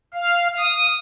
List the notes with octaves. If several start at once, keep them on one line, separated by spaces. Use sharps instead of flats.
F5
D#6